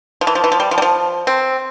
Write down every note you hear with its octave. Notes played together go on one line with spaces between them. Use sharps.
F3
E3
F3
E3
F3
G3
F3
G3
F3
C4